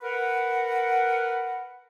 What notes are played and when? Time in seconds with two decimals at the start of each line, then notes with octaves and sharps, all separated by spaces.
0.02 A#4 B4 F#5